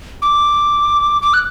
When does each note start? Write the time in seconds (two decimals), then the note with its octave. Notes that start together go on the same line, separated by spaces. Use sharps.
0.22 D6
1.22 D6
1.34 F#6